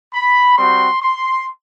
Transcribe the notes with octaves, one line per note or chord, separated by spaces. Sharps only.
B5
G3 C4 F#4 C6
C6